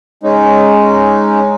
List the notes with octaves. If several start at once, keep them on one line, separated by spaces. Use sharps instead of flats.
G#3 C#4 D#4